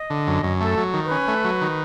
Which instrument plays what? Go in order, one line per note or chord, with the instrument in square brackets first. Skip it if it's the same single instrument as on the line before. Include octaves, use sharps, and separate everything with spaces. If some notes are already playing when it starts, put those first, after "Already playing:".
Already playing: [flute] D#5
[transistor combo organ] D3
F#2
F#2
[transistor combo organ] A3 [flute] A4
[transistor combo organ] F#3
D#3
[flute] B4
[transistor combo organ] C#4
A3
F#3
D#3